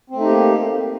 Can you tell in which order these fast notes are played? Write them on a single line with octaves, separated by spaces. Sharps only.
C4 A3 D#4 G4 A#3